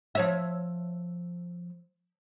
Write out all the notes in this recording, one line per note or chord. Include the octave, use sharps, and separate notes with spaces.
F3 C#5 E5